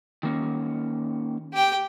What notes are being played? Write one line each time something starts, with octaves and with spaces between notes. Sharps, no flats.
D#3 A#3 C#4
G4 G5